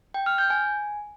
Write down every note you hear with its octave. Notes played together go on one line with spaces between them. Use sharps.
G5
F6
G6
G#5